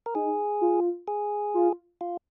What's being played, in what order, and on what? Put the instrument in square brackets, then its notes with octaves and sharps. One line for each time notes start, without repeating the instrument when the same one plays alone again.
[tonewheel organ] A#4
[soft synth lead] D#4 [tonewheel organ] G#4
[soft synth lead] F4
[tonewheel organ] G#4
[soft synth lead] F4
[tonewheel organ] F4